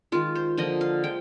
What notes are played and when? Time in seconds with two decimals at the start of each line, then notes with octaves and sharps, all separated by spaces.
0.12 D#3 G#3 F4
0.35 C5
0.58 D3 F3 A#3 D#5
0.81 F5
1.04 F3 G#3 G5